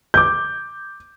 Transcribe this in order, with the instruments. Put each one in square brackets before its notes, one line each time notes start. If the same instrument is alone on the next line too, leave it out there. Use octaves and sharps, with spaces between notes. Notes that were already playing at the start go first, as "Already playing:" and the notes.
[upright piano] D6 G6